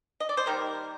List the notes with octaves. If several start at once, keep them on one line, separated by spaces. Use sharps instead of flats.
D#5
D5
C5
D#3 G3 A#3 A#4